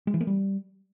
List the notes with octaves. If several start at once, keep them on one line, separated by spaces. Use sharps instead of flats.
G#3
E3
A#3
G3